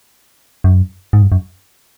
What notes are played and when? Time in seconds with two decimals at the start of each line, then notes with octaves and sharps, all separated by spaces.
0.64 F#2
1.13 G#2
1.22 G2
1.32 F#2